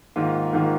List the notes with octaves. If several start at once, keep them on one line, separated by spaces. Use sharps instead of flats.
G#2 D#3 A#3 F4
G#2 D#3 A#3 F4